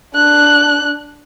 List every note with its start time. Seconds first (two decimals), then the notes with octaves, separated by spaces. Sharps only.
0.15 D4 F#6